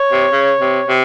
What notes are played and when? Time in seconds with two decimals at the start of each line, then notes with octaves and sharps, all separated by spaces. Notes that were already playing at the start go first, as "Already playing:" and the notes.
Already playing: C#5
0.12 C3
0.33 C#3
0.61 C3
0.88 C3